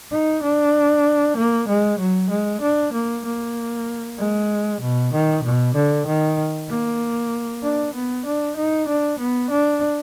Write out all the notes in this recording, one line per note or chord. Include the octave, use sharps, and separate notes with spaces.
D#4
D4
A#3
G#3
F#3
G#3
D4
A#3
A#3
G#3
B2
D#3
B2
D3
D#3
A#3
D4
B3
D4
D#4
D4
B3
D4